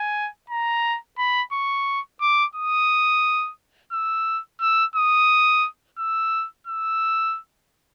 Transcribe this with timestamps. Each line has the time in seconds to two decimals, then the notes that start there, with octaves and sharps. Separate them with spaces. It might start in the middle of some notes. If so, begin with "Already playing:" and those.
Already playing: G#5
0.50 A#5
1.18 B5
1.52 C#6
2.21 D6
2.55 D#6
3.92 E6
4.61 E6
4.96 D#6
5.98 E6
6.67 E6